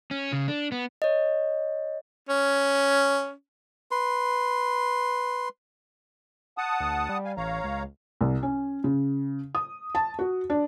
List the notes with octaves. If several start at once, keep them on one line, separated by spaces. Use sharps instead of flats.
C#4
C#3
D4
B3
C#5 D#5
C#4
B4 C6
F#5 A5 D#6
D2
G3
F5 G#5
A1 C#5 F5 A#5
C#2
C2
C#4
C#3
D#6
A5
F#4
D4